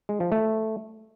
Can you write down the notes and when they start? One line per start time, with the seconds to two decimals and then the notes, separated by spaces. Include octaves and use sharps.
0.09 G#3
0.20 F3
0.32 A3